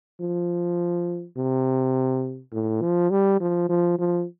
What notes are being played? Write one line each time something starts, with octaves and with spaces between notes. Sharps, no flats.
F3
C3
A2
F3
G3
F3
F3
F3